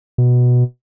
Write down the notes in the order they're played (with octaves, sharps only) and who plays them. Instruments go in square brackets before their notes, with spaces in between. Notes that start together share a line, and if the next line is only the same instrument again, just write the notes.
[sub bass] B2